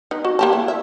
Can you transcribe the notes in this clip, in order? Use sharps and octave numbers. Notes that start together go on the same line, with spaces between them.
D#4 B4
F#4
A#3 G4 A5
E4
E5